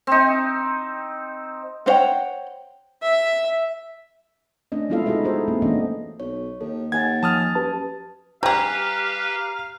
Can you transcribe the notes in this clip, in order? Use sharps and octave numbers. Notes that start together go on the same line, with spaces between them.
C4 D#4
B3 C5 C#5 F#5 G5
E5
A3 C#4 D4 D#5
G#3 B3 E4 F4 A4 F5
D#4 E4 F#4 G#4 D#5 E5
G#4 A4 C5
A#3 C4
E3 A3 B3 C#4 D4 D#5
B1 C#5
D#2 A4
D#2 F#5 G#5 G#6 A6
F3 A5 D#6 F6 A6
F#2 G4 B4 A5
G3 G4 G#4 B4 F5 A#5